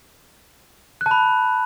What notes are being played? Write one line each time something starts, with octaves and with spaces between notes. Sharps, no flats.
F#6
A5
B5